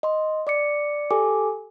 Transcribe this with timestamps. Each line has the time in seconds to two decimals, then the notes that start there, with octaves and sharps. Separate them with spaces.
0.03 D#5 C6
0.47 D5 D6 C#7
1.11 G4 A4 G#5 D6